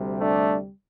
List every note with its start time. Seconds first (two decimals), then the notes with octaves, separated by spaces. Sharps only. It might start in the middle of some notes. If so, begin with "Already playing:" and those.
Already playing: D2 C3 G3
0.20 A3 D4